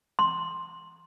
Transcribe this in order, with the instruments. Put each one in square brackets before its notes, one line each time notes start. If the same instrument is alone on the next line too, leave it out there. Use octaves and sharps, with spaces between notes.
[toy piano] C6